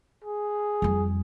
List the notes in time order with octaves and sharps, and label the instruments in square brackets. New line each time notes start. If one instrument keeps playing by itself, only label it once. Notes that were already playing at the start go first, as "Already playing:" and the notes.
[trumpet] G#4
[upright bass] F2 G3